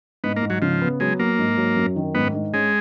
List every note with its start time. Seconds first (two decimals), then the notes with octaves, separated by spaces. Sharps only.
0.24 G#2 B3
0.36 A#3
0.43 G#2
0.50 F#3
0.62 C#3 F3
0.82 B3
1.00 F#3 G#3
1.19 F#3 A#3
1.39 G#2
1.57 F#3
1.77 F#2
1.96 D#3
2.15 G#2 B3
2.34 G#2
2.53 G#3 C#4